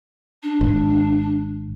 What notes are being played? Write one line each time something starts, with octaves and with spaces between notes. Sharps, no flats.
D4
G#1